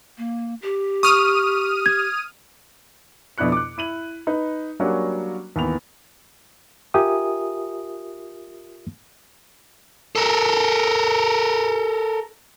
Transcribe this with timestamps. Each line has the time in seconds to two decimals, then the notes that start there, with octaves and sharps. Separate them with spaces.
0.18 A#3
0.62 G4
1.03 C#6 D#6 F6 D#7
1.86 G#6
3.38 F2 B2 D4 E4 F#6 C#7
3.52 D6 F#6
3.78 E4 D#7 F#7
4.27 D#4 B4
4.80 F#3 G3 A#3 C#4 D4 F#4
5.56 D#2 E3 B3 F7
6.94 F4 G4 A#4 E5 G#5 D#6
10.16 A4 A#4